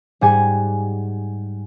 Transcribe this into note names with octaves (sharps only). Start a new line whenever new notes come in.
G#2 G3 F#5 G#5